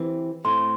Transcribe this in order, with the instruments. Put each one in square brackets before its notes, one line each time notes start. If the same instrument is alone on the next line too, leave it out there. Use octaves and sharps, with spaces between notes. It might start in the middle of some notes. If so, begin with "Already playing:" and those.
Already playing: [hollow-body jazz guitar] E3 C4 G4
[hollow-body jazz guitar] A2 A3 C4 [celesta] C6